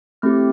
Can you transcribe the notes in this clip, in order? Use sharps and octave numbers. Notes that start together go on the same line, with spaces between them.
A3 C4 E4 G4 F6